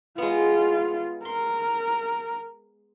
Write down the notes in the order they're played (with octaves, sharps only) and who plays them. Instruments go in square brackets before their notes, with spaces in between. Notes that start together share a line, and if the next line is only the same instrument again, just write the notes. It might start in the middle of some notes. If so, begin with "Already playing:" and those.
[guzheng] G#3 B3 [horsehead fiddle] F4
[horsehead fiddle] A#4 [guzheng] C6